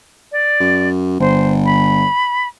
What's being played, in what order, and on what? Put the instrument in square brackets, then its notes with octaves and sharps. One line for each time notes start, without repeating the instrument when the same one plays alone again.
[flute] D5
[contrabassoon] F#2
[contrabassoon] G1 [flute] C5
[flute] B5